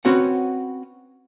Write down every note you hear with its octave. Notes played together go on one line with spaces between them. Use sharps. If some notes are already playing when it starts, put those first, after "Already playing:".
C4 C#4 F#4 B4 F#5